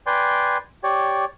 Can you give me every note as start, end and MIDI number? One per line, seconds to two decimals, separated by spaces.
0.06 0.57 71
0.06 0.57 74
0.06 0.57 79
0.06 0.57 80
0.06 0.57 84
0.83 1.25 67
0.83 1.25 73
0.83 1.25 74